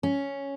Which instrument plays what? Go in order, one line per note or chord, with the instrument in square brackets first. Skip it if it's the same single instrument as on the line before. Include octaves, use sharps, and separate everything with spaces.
[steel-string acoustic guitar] C#4